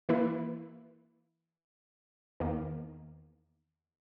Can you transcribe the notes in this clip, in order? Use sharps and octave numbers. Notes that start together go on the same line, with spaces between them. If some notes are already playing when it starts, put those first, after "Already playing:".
E3 A#3 E4 B4
E2 D#3 A#3